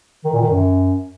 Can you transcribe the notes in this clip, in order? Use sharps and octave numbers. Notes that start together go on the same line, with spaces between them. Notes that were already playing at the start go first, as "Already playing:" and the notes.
D#3
A#2
D#3
F#2